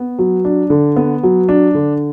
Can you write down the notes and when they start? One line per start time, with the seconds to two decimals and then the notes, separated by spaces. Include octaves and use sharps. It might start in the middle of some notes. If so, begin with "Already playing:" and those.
Already playing: B3
0.19 F#3
0.45 D4
0.70 D3
0.96 B3
1.23 F#3
1.49 D4
1.75 D3